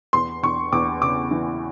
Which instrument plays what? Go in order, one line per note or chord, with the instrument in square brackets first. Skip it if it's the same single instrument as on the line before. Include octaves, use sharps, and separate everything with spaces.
[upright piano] E2 C6
E2 C#6
E2 D6
C#3 D6
E3